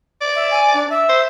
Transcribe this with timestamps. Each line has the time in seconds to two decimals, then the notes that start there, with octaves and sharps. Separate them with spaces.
0.21 D5
0.35 E5
0.51 G#5
0.74 D4
0.90 E5
1.09 C5